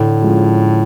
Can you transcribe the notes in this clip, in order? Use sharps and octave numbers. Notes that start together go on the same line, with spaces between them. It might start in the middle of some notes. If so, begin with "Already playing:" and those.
Already playing: A2 D3
F3 G#3 C#4 F4